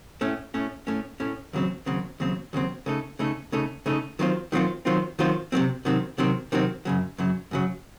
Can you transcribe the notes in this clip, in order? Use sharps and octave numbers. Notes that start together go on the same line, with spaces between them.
A2 A3 C#4
A2 A3 C#4
A2 A3 C#4
A2 A3 C#4
D#2 C#3 F#3 C4
D#2 C#3 F#3 C4
D#2 C#3 F#3 C4
D#2 C#3 F#3 C4
C#3 A3 D#4 A4
C#3 A3 D#4 A4
C#3 A3 D#4 A4
C#3 A3 D#4 A4
D#3 F#3 C4 F4 C5
D#3 F#3 C4 F4 C5
D#3 F#3 C4 F4 C5
D#3 F#3 C4 F4 C5
C3 D#3 F#3 C4
C3 D#3 F#3 C4
C3 D#3 F#3 C4
C3 D#3 F#3 C4
F#2 C#3 F#3
F#2 C#3 F#3
F#2 C#3 F#3